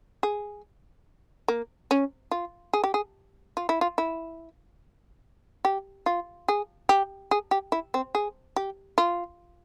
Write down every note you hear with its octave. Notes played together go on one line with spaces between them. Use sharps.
G#4
A#3
C#4
F4
G#4
G4
G#4
F4
E4
F4
E4
G4
F4
G#4
G4
G#4
G4
E4
C4
G#4
G4
F4